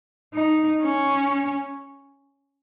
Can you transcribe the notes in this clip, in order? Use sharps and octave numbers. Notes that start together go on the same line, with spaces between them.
D#4
C#4